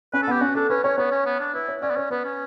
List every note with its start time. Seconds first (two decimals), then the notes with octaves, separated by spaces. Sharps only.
0.13 C#4 B4
0.23 A4
0.28 B3 G4
0.41 C#4 F#4
0.55 D4 A4
0.69 C#4 B4
0.84 C#4 C#5
0.98 B3 C#5
1.12 C#4
1.26 B3
1.40 D4
1.54 E4 B4
1.68 C#5
1.82 C#4 D5
1.90 B3
1.96 C#4 C#5
2.11 B3 B4
2.24 C#4